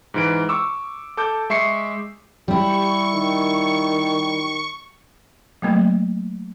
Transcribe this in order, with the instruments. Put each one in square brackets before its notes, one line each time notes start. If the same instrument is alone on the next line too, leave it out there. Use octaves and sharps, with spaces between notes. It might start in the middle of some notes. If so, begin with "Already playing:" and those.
[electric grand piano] G#2 E3 D7
C#6 D6 E6
A4 D6 G6
G#3 E5 C#6 C7 C#7
[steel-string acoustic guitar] G3 E4 [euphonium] G4 [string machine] C#6
[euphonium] D#3
[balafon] F#3 A3 A#3